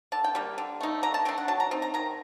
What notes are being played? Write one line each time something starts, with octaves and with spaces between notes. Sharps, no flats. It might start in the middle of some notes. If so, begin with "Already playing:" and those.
D3 A5
G5
G3 A#3
D3
A3 D#4
D3 A#5
A5
A3 D4 G5
F#5
F#3 A5
A#5
C4 D#4
A#5
D#3 A#5